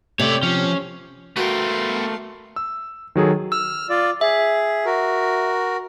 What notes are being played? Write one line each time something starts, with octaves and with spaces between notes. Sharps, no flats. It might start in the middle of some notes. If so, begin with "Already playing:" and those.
C3 A3 C#5 D5
F3 C#4
A3 B3 F#4 A#4 F5 G5 C6
E6
D#3 F#3 G#4 A4
E6 F6
F4 D5
G#4 E5
F#4 A#4